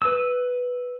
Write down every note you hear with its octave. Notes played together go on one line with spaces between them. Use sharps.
B4 E6